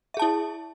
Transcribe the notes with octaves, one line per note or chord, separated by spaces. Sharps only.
E4 G#4 E5 A5